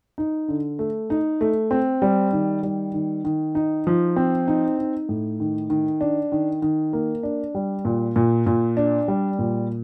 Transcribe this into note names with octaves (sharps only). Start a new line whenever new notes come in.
D#4
D3
A3
D#4
A3
C4
G3
D#3
G3
D#3
D#3
D#4
F3
C4
D#4
D#4
A2
D#3
D#3
D4
D#3
D#3
A#3
D4
G3
A#2
A#2
A#2
D4
G3
A#2